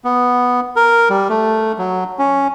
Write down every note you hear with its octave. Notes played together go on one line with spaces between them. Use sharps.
B3
A#4
G3
A3
F#3
C#4